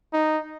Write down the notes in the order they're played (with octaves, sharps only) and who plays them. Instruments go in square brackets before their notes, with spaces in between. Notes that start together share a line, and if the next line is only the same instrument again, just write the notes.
[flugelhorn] D#4